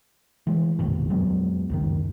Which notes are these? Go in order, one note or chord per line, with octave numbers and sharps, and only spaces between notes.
E3 G#3
F1 A#1 D#2 B2
F2 F#3 G#3 B3
C#2 F#2 D#3